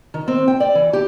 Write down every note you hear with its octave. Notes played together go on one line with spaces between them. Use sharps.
D#3
C4
G5
D5
E3
G4